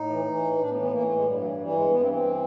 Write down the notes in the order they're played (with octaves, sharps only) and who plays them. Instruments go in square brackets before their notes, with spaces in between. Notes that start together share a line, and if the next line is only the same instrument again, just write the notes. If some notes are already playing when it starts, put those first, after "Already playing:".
Already playing: [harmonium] A2 D#4
E3
E3
A2
A2 D4
B3
E3
B3
E3 A#3
A2 A3
G#3
G2 G3
F#3
E3
G3
E3 G3
G2 G#3
G2 B3
C4
E3
C4
E3